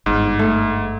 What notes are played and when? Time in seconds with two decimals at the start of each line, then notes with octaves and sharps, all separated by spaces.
0.06 G1 G#2
0.39 A3